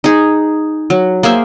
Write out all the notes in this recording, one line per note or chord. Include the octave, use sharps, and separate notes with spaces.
D#4 G#4
F#3
A#3 G#4 C5 E5